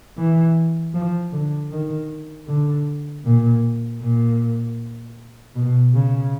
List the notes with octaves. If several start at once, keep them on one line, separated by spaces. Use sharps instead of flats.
E3
F3
D3
D#3
D3
A#2
A#2
B2
C#3